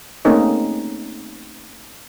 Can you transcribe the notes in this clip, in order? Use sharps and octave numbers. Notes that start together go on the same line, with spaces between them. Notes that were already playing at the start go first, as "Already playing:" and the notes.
A3 A#3 C4 C#4 D#4 G#4